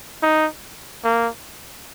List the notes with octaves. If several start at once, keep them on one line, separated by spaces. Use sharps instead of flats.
D#4
A#3